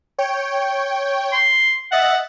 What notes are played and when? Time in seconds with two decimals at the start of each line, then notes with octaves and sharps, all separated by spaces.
0.18 C#5 G5
1.32 C6
1.92 D#5 E5 F#5 A6